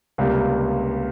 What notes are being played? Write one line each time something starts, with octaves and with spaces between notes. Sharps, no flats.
C#2 C3 G3 A#3